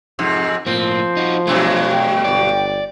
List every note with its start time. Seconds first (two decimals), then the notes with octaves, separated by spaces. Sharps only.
0.19 F2 G#2 C3
0.67 A2 F3 A#3 C4
1.17 D#4 F#4
1.47 G2 B2 F#3 A3 G#4
1.91 G5
2.24 G1 D5